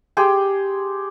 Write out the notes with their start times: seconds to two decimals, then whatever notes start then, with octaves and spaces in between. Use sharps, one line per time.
0.17 G4 G#4 G5 C6